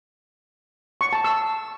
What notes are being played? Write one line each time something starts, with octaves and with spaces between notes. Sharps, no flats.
C#6
A5
E6